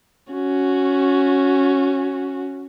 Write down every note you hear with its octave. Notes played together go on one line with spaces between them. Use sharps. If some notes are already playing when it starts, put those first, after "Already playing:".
C#4 F#4